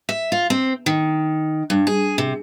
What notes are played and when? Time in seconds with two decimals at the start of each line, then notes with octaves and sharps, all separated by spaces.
0.09 E5
0.32 F4
0.50 C4
0.86 D#3
1.70 G2
1.87 G#4
2.18 C3